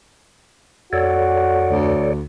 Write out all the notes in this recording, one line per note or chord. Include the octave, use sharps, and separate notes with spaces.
F2 F#4 A4 C#5 D5
D2